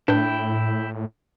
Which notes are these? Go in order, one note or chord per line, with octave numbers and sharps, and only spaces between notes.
A2 D4 E4 B4 G5